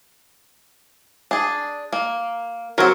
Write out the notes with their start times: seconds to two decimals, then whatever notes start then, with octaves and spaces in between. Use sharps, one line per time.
1.31 D4 G#4
1.93 A#3
2.78 F#3 C4 F#4 A#4